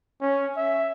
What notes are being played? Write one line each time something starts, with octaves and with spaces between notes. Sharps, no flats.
C#4
E5